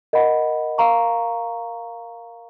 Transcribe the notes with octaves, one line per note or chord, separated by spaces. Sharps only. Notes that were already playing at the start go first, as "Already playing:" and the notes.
A#4 D#5 F#5 B5
A#4 F5 A#5 C#6